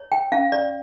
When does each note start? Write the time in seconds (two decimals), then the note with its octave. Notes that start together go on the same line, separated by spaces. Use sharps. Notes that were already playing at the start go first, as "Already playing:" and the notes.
Already playing: C#5
0.12 G5
0.32 C#4 F5
0.52 D5